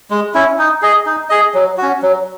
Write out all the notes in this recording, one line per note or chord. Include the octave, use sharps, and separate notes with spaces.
G#3
C#4 E4
D#4
G#4 D#5
D#4
G#4 D#5
F#3
C#4 F#4
F#3